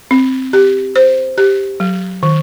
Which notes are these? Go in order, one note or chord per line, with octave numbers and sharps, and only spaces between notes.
C4
G4
C5
G4
F#3
D#3